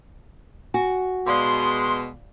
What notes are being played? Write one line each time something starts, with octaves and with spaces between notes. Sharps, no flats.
F#4 G#5
B2 G#3 D5 F5 C6 D6